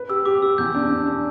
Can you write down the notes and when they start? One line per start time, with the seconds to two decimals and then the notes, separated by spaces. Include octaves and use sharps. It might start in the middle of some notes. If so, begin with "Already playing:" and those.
Already playing: B4
0.09 G4 E6
0.25 G4 D6
0.42 G4 E6
0.58 E2 G6
0.75 D4
0.90 D4
1.06 D4